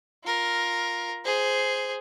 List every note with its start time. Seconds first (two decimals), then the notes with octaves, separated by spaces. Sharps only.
0.24 F4 A#4
1.25 G#4 C5